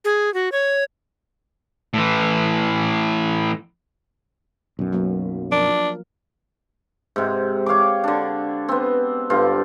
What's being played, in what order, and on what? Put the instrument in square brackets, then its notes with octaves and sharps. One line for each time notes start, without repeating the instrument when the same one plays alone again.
[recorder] G#4
F#4
C#5
[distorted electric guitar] A2 E3
[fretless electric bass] B1 F#2
[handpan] F#3 A#3 B3
[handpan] F3 A#4 [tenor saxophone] D4
[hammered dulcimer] G#2 C3
C#5 F5 G5 D6
D3 D4
B3 C4
G2 D3 C4 F4